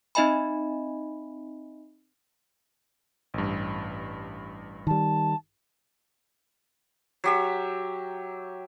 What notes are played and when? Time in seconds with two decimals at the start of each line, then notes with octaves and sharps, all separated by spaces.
0.15 C4 D#4 D#5 E5 G#5 B5
3.34 A1 G2
4.87 D#3 G3 A5
7.24 F#3 G4 E5